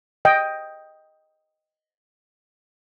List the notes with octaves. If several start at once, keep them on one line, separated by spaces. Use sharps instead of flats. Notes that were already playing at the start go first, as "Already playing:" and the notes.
D#5 G5